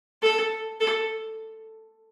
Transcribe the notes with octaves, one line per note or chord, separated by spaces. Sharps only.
A4
A4